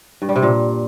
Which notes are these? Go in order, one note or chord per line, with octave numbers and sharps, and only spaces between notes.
G2
G3
C3
A#2